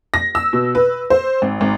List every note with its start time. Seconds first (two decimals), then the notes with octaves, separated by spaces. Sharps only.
0.14 A#6
0.35 E6
0.53 B2
0.75 B4
1.10 C5
1.42 G#1
1.61 G#1